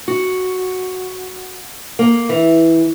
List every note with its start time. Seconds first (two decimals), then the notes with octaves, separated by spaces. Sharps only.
0.08 F#4
1.99 A#3
2.29 E3